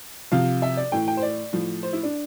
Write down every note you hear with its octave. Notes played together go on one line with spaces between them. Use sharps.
C3 F3 F5
E5
D5
A2 E3 G5
G5
C5
D5
A2 F3
C5
E4
D4